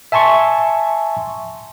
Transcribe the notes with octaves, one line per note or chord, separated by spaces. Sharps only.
E5 G#5 A5 C6 C#6